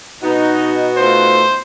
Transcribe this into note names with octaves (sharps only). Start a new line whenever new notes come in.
B2 B3 D#4 F#4
A3 D#4 F4 C5